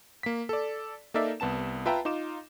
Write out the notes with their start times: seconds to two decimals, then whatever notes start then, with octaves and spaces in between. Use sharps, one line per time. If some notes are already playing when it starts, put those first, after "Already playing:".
0.23 A#3 B6
0.49 A4 D5
1.14 A#3 D#4 A4 A#4 D5 E5
1.40 C2 B3 A5 E7
1.86 F4 B4 E5 G5 A5 A#5
2.05 D#4 F4 D6 E7